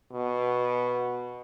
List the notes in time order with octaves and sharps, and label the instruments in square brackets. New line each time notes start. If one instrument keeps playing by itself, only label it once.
[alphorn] B2